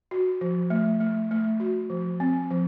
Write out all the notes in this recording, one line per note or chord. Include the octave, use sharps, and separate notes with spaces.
F#4
F3
A3
A3
A3
F#4
F3
C4
F3